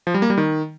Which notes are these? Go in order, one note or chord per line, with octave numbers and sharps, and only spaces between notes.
F3
G3
A#3
G3
D#3